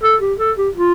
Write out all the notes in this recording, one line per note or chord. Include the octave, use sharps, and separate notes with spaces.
A4
G4
A4
G4
F4